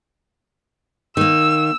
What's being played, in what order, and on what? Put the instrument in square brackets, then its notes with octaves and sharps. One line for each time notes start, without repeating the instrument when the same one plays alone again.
[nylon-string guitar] D#3 A#3 [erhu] E6